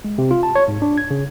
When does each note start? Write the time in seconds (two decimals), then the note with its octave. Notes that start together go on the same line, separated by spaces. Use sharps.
0.04 G#3
0.18 C3
0.31 F4
0.43 A5
0.55 C#5
0.68 G#2
0.82 D4
0.98 G#6
1.11 C#3